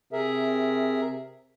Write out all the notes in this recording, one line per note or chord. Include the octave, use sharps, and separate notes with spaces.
C3 G#4 A#4 E5